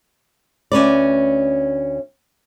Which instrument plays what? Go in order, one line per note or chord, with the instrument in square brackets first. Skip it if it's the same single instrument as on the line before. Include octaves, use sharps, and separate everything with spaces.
[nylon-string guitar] D2 C#4 B4 D5